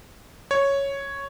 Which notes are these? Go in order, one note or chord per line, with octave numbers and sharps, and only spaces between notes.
C#5